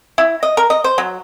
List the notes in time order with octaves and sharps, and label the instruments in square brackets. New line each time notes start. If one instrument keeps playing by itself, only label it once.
[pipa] E4
D#5
A#4
D#5
C5
F#3